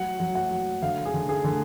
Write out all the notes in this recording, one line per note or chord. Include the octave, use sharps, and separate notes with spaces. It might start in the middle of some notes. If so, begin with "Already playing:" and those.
Already playing: F#3 F#5
F#3
F#5
F#3
D3 F5
G#4
D3
G#4
D3